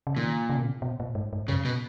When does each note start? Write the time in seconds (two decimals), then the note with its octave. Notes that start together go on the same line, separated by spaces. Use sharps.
0.07 C#3
0.16 A#2 D#3
0.49 C#3
0.57 B2
0.65 C#3
0.82 B2
1.00 A#2
1.15 G#2
1.33 G#2
1.48 F#2 C#3
1.65 B2